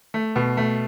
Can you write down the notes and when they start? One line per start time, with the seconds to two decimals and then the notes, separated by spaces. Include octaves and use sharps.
0.14 A3
0.36 B2
0.57 A3